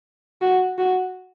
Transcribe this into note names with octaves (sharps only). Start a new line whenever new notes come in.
F#4
F#4